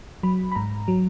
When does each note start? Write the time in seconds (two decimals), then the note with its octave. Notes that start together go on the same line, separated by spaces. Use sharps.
0.23 F#3 B5
0.52 B5
0.56 G#2 A#5
0.88 F#3